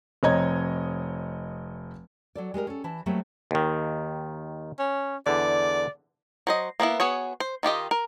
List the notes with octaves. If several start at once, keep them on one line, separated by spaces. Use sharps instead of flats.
F1 C4 C#5 D#5 A#5 G#6
F#3 A4 D5
G#3 G4 A4 A#4
C#4 A4
E3 A5
F#3 G3 A3 A#3 C4 G#4
D#2 D#3
C#4
E2 D3 D5
F#3 C5 D#5
A#3 B3 C#4 E4
B3 F#4 G#4 C#5
C5
D#3 F4 G4 D#5
A#4